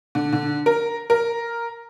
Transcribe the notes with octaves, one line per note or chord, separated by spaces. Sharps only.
D3
D3
A#4
A#4